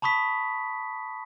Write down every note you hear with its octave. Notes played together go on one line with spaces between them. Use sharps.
A5 B5 C#6 D#6 B6